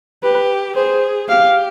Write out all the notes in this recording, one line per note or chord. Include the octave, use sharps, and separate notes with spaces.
G4 B4
G#4 C5
G4 F5